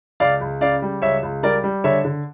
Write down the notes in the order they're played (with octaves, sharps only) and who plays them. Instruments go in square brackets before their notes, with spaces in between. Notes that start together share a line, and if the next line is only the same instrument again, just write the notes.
[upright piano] C#2 D5 F5
C#2
C#3 D5 F5
G3
C#2 C#5 E5
C#2
G3 A#4 D5
G3
D3 C#5 E5
D3